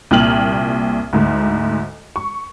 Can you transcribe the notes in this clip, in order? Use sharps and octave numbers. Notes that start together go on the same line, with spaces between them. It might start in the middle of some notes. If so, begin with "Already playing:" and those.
C2 A#2 G5 F6 F#7
D2 G#2
C#6